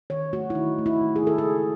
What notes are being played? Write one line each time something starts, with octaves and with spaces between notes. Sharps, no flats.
D#3 C#5
A3 F#4
E4
D#3 D#4
A3
E4
D#3
G#4
D#3 A4
G#4
C#3